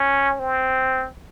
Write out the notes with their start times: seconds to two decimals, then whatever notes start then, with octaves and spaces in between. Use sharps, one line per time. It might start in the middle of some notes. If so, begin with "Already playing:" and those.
Already playing: C#4
0.40 C4